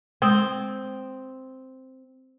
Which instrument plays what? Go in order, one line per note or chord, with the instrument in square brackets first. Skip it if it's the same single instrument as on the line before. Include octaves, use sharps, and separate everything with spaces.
[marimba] G#3 D#6 [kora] C4